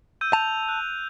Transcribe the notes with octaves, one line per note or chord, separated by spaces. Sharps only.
E6 G6 D#7
A5 F7
F#6